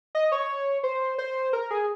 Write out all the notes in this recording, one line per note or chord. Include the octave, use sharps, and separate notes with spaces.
D#5
C#5
C5
C5
A#4
G#4